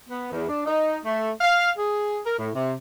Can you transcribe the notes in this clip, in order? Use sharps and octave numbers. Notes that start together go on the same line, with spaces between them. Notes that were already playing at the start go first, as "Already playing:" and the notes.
B3
E2
D4
D#4
A3
F5
G#4
A#4
A2
C3